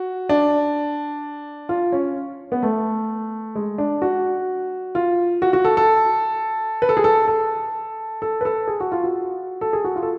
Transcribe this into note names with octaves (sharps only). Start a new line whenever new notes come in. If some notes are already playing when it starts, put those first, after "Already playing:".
Already playing: F#4
D4
F4
C#4
B3
A3
G#3
D4
F#4
F4
F#4
F#4
A4
A4
B4
A4
G#4
A4
A4
A4
B4
A4
G#4
F#4
F4
F#4
A4
G#4
F#4
F4
A4